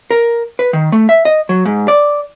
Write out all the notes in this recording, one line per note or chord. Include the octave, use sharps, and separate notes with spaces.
A#4
B4
D#3
A3
E5
D#5
F#3
G#2
D5